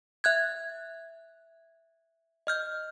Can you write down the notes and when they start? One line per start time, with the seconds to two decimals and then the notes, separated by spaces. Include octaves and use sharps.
0.24 E5 F#6 G#6
2.47 D#5 F6 G6